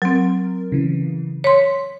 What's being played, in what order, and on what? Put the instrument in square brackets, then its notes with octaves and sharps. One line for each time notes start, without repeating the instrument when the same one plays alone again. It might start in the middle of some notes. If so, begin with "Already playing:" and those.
[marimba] F#3 C4 [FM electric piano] A#4
[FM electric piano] C#3 E3
[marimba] C#5 C6 [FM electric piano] B6